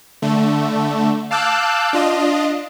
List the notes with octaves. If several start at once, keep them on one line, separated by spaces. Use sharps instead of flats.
D3 A3
F5 A5 D6 E6 F#6 G6
D4 F4 D#5